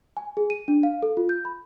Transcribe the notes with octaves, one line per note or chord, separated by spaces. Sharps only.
G#5
G#4
D#7
D4
F5
A4
F4
G6
B5